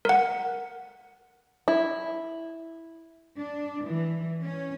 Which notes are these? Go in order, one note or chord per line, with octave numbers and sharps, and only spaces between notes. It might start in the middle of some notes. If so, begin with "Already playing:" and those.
A#4 F#5
E4
D4
E3
C#4